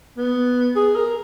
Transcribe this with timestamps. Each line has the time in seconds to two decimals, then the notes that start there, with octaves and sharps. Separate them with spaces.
0.17 B3
0.76 G#4
0.96 A#4